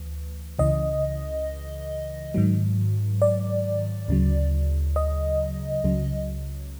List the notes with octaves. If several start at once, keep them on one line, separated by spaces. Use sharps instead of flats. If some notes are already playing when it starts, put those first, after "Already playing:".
Already playing: D2 E3
C#2 C#3 E3 D#5
G#2 D#3 F#3
D5
D2 C#3 F#3
D#5
C#2 C#3 F#3